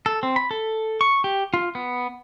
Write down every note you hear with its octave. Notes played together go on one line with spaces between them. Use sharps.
A4
C4
B5
A4
C#6
G4
F4
B3